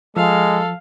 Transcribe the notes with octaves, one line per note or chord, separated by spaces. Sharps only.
F3 G#3 A4 F5